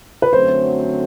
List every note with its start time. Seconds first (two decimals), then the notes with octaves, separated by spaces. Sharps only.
0.22 B4
0.33 F#2 D3 F#3 A3 C4 C5